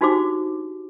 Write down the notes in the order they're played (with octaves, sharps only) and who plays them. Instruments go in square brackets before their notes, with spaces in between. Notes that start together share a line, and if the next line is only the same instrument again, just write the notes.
[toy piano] D4 D#4 F#4 G4 C5 D6